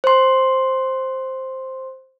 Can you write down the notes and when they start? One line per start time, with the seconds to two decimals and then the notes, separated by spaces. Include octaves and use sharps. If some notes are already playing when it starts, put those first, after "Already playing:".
0.04 C5 C6